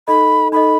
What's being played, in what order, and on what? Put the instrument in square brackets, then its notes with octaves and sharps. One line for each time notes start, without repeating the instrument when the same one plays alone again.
[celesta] D#4 A4 D#5 [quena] B5
[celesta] D#4 A4 D#5 [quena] B5